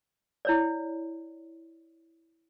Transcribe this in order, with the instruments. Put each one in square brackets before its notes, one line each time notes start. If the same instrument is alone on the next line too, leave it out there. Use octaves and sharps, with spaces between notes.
[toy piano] E4 C#5 D5